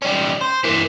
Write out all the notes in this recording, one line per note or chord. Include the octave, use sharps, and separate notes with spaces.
G3 C#4
C5
E3 A#3